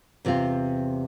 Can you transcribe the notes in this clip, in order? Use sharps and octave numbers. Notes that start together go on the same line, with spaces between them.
E2 C3 C4 F4